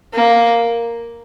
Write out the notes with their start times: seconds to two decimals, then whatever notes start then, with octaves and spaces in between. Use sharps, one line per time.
0.14 A#3